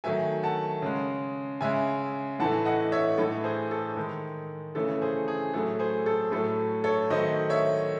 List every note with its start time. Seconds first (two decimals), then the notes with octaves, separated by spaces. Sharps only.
0.04 D#3 F#3 A3 E5 G#5
0.43 F#5 A5
0.82 C#3 G#3
1.61 C#3 G#3 E5 G#5
2.39 A2 E3 A3 F#5 A5
2.65 D#5 F#5
2.92 C#5 E5
3.18 A2 E3 A3 A4
3.44 G#4 C5
3.71 A4
3.97 D#3 G#3
4.75 C#3 E3 A3 A4
5.02 G#4 C5
5.28 G#4
5.54 A2 F#3 A3 A4
5.79 G#4 C5
6.06 A4
6.32 A2 F#3 A3 A4
6.84 A4 C#5
7.10 D#3 F#3 A3 C5 D#5
7.50 C#5 E5